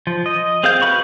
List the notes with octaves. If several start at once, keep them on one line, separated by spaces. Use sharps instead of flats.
F3
D#5
C4 G#4 A#4 F5 G6
F#4 A#4 B4 B5 C#6